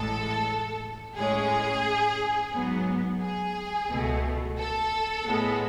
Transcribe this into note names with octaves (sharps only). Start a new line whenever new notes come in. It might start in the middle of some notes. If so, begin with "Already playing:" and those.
Already playing: A1 A2 G#3 A4
A2 G#3 C#4 G#4
G#2 F#3 B3
G#4
C#2 B2 A3
A4
A2 G#3 B3